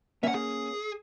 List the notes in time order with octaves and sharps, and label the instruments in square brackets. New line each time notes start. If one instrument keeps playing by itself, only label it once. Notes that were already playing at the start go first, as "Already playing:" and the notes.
[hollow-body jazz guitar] A#3 C#4 [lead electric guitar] E5 F#5
[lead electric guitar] G#4